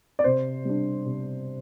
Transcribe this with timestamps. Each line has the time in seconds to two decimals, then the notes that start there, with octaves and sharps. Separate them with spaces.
0.19 D5
0.24 C3 C5
0.65 G3 D4
1.06 C3